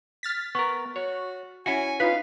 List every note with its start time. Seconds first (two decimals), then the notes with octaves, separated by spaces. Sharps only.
0.23 F6 A6 B6
0.55 B3 A#4 C#6
0.96 F#4 C#5
1.66 C#4 E4 F#4 G#5 C#7
2.00 D#4 F4 B4 F5 B6